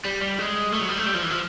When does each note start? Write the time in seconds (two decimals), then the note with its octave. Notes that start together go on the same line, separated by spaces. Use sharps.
0.05 G3
0.22 G3
0.39 G#3
0.72 A3
0.81 F#3
0.89 G3
0.98 A3
1.06 G3
1.15 F3
1.23 E3
1.31 F3